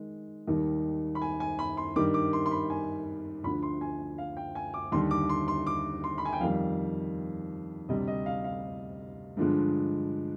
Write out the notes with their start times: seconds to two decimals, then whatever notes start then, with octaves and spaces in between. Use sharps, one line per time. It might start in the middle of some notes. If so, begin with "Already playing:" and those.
Already playing: D#3 G#3
0.48 D#2 D#3 G3
1.15 B5
1.22 G#5
1.40 G#5
1.59 B5
1.77 C6
1.96 G2 D#3 G3 D6
2.14 D6
2.33 C6
2.46 C6
2.51 B5
2.70 G#5
3.44 D2 D3 F3 B5
3.63 C6
3.81 G#5
4.18 F5
4.37 G5
4.55 G#5
4.74 D6
4.92 D#2 D3 G3 C6
5.11 D6
5.29 C6
5.48 C6
5.67 D6
6.04 C6
6.18 B5
6.25 G#5
6.33 G5
6.41 F2 D#3 G3 F5
7.89 D2 C3 G3 D#5
8.08 D#5
8.26 F5
8.44 F5
9.37 G2 D3 F3 G#3